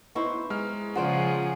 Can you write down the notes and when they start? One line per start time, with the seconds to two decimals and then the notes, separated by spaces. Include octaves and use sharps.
0.15 B3 D#4 E4 C5 C6 C#6
0.50 G#3 A#5 F6
0.95 C#3 F3 F4 G#4 C5 D5 F#5 A#5